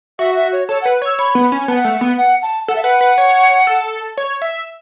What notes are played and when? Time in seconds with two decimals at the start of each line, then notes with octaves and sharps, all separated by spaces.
0.19 F#4 E5
0.36 E5
0.52 C#5
0.69 A4 C#5
0.81 F#5
0.85 B4
1.02 C#5 E6
1.19 C#5 B5
1.35 B3
1.52 C#4
1.68 B3 A5
1.73 F#5
1.84 A3
2.01 B3
2.18 F#5
2.42 A5
2.68 A4 F#5
2.76 E5
2.83 B4 F#5
3.01 B4
3.18 C#5
3.67 A4
4.18 C#5
4.42 E5